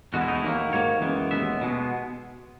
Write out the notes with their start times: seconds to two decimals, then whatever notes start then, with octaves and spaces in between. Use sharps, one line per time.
0.14 E2 B2 G#3 B3 F#4
0.21 E4
0.28 D#4
0.35 E4
0.42 D#2 D#3 F#3 A#3
0.72 G#2 D#3 A#3 C#5
1.01 F#2 E3 G#3 B3
1.31 D#2 D#3 G#3 B3 E5
1.61 B2 G#3 B3